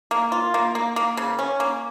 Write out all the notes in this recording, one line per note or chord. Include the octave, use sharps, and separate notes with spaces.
A#3
F4
A#3
A#3
A#3
C#3
C#4
A#3